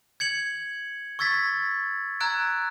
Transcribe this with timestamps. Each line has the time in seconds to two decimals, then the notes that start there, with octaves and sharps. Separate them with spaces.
0.20 G#6 C#7 F#7
1.19 C#6 E6 G#6 A6 B6
2.20 A#5 E6 F#6 G#6 D7